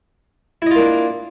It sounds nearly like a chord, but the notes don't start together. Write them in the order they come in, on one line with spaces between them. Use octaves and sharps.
E4 D#5 F4 A#3 D4